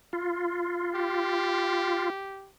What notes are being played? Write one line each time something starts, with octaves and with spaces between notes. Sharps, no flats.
F4
G4